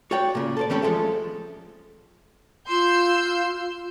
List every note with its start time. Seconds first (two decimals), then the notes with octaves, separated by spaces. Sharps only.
0.11 F#4 C#5 D5 G5
0.35 A#2 C#3
0.57 A4 C5 D5
0.70 E3 G3 A3 C4 C#4 G4
0.82 F3 G#3 A4 E5
2.69 F4 C6 E6 G6